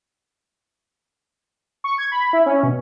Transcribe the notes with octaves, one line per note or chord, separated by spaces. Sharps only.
C#6
G#6
B5
E4
C#4
B2